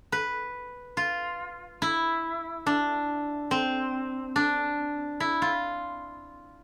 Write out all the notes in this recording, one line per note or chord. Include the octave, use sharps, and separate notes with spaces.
B4
F4
E4
D4
C4
D4
E4
F4